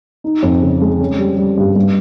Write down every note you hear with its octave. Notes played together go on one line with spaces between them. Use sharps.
D#4
F2
C#3
G#3
C#4
G3
G3
G2
G2